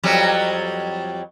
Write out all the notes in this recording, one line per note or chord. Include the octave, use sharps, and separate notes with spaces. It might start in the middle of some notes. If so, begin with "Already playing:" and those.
F2 F#3 G3